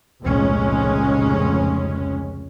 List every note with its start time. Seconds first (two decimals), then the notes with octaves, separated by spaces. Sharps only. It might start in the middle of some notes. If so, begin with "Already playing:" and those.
0.22 F1 C#2 A#2 G#3 C#4